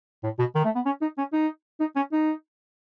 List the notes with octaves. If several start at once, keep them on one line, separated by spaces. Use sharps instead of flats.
A2
B2
D#3
A3
B3
C#4
D#4
C#4
D#4
D#4
C#4
D#4